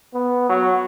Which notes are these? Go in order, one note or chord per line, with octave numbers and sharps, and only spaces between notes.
B3
F#3